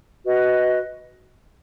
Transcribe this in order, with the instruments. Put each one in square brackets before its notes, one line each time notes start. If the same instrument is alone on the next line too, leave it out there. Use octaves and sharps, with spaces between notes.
[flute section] F#4 B4 D#5